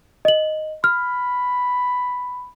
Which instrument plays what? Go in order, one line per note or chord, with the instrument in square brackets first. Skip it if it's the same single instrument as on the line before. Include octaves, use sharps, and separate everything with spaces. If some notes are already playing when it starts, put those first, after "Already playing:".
[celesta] D#5 F#7
[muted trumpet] B5 [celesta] F6